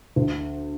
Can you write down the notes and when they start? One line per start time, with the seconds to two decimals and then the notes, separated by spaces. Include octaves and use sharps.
0.16 D2